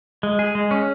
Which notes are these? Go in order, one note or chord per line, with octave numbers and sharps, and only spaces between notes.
G#3
G#4
G#3
C#4